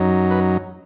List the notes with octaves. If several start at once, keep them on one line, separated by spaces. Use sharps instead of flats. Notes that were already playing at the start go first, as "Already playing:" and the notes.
Already playing: F#2 F#3 D#4
B4